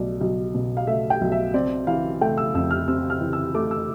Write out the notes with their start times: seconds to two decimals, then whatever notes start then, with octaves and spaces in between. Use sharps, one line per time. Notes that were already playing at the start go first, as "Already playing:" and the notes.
Already playing: B1 A3 D5
0.21 B1
0.55 B2
0.77 F5
0.87 A3 E5
1.10 G5
1.21 B1
1.32 E5
1.54 C4 D5
1.87 E3 F5
2.21 A3 G5
2.38 E6
2.54 F2 E6
2.71 F6
2.88 C4 E6
3.10 F6
3.21 E3
3.33 E6
3.54 A3 D6
3.71 E6